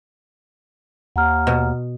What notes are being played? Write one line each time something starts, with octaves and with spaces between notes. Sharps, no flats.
D#2 F#5 A#5 F6
B2